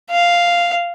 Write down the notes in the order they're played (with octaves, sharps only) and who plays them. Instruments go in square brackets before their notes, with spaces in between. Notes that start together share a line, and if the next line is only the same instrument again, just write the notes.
[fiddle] F5